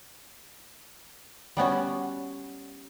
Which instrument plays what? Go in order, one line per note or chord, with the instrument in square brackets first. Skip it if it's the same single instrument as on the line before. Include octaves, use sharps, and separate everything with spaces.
[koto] G3 B3 C#4 F#4